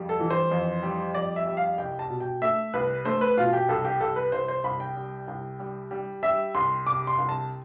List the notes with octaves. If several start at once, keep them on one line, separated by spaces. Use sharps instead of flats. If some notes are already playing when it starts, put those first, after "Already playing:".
Already playing: F2 G3
A4
E3
C5
F2
G3
F2 D5
E5
G3
F5
C2 G5
A5
B2
G5
A3 E5
C2 B4
A3 C5
B4
B2 F4
G4
C2 A4
G4
C2 A4
B4
C2 C5
C5
C2 B5
G5
G3
C2
G3
G3
G3 E5
C2 C6
C3 D6
C6
C2
A5